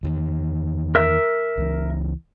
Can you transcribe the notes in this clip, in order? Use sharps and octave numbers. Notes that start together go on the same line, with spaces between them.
E2 D#3
A#4 E5
C#2 E3